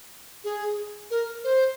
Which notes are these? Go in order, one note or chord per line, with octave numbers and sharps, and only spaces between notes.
G#4
A#4
C5